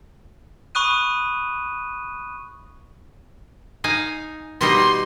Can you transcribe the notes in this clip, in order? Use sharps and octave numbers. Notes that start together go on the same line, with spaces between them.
B5 C#6 D#6 F#6 D#7
D#4 F5 G#5
B2 G3 D#4 C6